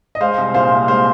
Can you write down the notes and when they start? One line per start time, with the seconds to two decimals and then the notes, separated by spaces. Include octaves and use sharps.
0.15 D#5
0.21 G#3 C5 F5
0.38 C2
0.54 A#2 C5 F5
0.72 C2
0.88 G#3 C5 F5